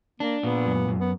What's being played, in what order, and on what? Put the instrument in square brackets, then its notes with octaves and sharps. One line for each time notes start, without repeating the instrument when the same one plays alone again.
[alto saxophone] A#3 [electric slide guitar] D4
[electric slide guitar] A#2 [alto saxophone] B3
[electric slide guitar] F#2
F#2
[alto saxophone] B3